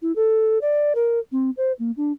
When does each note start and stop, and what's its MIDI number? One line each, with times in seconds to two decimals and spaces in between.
0.02 0.14 64
0.16 0.58 69
0.61 0.93 74
0.95 1.19 70
1.32 1.50 60
1.57 1.72 72
1.79 1.91 58
1.97 2.12 62